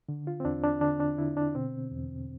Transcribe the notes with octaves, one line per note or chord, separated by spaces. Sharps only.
D3
F4
C4
E2 D4
D4
D3 D4
D4
D3 E4
D4
B2 C4
E2